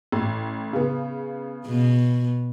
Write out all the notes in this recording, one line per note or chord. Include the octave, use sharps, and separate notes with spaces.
A1
C#3 B3
B2